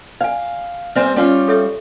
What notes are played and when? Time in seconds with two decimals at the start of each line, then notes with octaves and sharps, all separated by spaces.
0.21 D5 F5 G#5
0.95 G3 C4 B4 E5 G#5
1.16 G3 C#4 F4
1.48 A4 C#5 E5